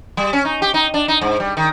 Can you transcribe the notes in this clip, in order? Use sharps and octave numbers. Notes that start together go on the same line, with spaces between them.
G3
C#4
D#4
G4
D#4
D4
D#4
G#2
G3
D#3